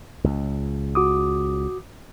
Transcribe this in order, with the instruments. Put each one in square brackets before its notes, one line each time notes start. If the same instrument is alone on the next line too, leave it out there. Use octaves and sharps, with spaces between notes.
[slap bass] C#2
[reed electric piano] F#4 D6 D#6